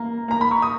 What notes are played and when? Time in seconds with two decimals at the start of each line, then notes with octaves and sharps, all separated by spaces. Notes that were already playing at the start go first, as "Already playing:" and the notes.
Already playing: A#3
0.28 A#3 A#5
0.41 B5
0.51 C#6
0.62 D#6